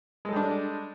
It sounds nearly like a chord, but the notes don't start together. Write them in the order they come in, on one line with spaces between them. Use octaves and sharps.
G#3 A4 G3 D4